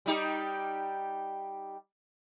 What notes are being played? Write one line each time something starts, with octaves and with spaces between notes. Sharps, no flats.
G3 D#4 G4